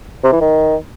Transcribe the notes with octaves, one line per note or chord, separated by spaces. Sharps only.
C3
E3
D#3